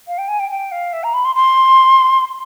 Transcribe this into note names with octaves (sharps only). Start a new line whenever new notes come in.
F5
G5
G#5
G5
G5
F5
E5
A#5
B5
C6
C6